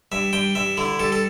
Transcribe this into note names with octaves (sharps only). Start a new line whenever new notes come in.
G2 E5
G2 G5
G2 E5
D3 E4
G2 A4
A4